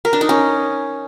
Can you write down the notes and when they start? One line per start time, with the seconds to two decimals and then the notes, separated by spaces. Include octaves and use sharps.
0.05 A#4
0.13 D4
0.21 D#4
0.29 C#4